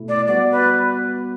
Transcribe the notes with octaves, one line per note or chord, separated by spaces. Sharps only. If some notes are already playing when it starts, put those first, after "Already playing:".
Already playing: B2 A3 E4
D5
G3 B3 F#4 D5
B4